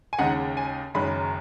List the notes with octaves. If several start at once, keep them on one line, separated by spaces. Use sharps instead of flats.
G#5
D#2 C#3 G#3 D#4 F#5
G#5
F#1 F#2 D#3 G#3 C#4 B5